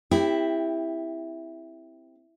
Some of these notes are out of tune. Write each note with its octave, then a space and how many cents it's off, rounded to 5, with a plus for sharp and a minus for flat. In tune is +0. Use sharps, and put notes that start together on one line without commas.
C4 +0 E4 +0 G4 +25